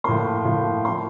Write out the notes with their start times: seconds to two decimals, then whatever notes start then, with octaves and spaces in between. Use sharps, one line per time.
0.04 A2 F3 A#3 C6
0.45 A2 F3 A#3
0.85 F3 A#3 C6